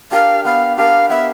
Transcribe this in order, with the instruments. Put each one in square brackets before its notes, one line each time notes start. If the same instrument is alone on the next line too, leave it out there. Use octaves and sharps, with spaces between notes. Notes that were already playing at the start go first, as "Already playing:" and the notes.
[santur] D4 G4 A#4 [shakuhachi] F5
[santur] B3 [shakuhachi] F5
[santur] D4 G4 A#4 [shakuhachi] F5
[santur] B3 [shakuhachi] E5